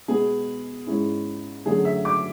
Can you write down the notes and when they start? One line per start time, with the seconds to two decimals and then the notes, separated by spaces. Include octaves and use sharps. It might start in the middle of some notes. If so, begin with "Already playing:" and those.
0.08 B2 G#3 B3 G#4
0.87 G#2 G#3 C#4 E4
1.66 F#2 D3 F#3 A3 G#4
1.85 E5
2.05 D6